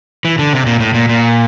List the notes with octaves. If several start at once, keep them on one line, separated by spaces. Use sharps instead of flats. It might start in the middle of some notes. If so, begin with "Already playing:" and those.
E3
D3
C3
A#2
A2
A#2
A#2